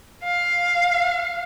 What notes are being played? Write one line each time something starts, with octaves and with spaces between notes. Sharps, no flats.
F5